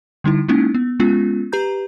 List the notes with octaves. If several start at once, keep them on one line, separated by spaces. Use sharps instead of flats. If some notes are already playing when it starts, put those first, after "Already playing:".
D3 G3 D#4 E4
G#3 A#3 C#4 D#4 E4
B3
G#3 B3 C#4 F4
G4 B4 A#5 G6